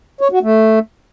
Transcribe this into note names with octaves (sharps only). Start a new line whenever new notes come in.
C#5
F#4
A3